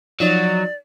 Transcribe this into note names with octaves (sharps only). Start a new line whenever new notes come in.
F3 F#3 D#4 D5